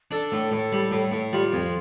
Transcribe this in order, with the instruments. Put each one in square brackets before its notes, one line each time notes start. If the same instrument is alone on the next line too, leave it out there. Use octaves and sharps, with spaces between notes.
[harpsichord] D4 [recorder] A4
[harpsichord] A2
A2
G3
A2
A2
[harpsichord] G3 [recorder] F4
[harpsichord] F2